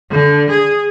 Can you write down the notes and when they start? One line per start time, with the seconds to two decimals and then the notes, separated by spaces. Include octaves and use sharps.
0.12 D3
0.51 G#4